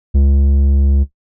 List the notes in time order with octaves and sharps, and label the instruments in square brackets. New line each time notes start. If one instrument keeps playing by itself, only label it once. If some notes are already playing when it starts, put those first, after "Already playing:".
[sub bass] C#2